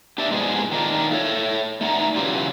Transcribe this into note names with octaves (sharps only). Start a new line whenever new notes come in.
D4 G4 D5 E5
G#2 C3 F3 G#3 B3 G#4
D#3 D4 D#4 F4
A3 A4 C#5
A3 D#4 D5 F#5 A#5
C#3 E3 F#3 F4 G4